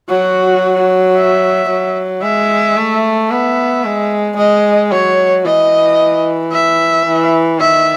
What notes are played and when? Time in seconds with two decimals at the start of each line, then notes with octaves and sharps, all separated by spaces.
0.09 F#3 F#4
1.16 E5
1.70 F#3
2.23 G#3 E5
2.77 A3
3.30 B3 E5
3.84 G#3
4.38 G#3 D#5
4.91 F#3 C#5
5.45 E3 D#5
6.52 E5
7.06 E3
7.59 D#3 E5